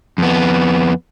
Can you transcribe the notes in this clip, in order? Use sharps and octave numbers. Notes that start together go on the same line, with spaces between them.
F2 B3